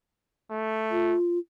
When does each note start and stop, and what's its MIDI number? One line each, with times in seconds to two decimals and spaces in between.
0.50 1.15 57
0.91 1.38 65